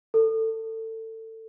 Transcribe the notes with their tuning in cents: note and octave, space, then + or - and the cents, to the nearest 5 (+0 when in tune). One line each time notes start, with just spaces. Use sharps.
A4 +25